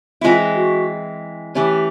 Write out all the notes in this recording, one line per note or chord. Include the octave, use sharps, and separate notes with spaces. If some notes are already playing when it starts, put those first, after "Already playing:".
E3 G#3 C4 E4 F4
F#4
E3 A3 C#4 G4